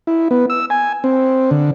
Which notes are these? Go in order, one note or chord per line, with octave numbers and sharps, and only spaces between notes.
E4
B3
E6
G#5
C4
D3